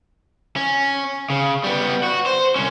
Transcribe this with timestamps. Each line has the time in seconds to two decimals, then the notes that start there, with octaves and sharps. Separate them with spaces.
0.56 C#4
1.30 C#3
1.64 G3 B3
2.03 F#4
2.26 C5
2.56 C2 C#4